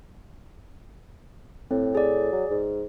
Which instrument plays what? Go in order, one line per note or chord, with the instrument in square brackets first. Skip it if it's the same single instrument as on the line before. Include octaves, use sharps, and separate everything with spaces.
[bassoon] A2 [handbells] C4
[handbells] G#4 D5
[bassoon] F#3
G#2